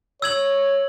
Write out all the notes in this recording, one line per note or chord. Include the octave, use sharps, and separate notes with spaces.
C#5 E6 G#6 F#7